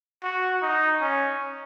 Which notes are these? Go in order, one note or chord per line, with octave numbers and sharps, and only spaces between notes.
F#4
D#4
C#4